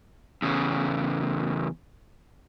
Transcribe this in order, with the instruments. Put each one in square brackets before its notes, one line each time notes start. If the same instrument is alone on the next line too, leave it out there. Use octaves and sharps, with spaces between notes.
[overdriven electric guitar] E2 C#3